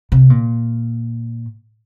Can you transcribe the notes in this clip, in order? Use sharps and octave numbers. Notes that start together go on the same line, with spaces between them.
C3
A#2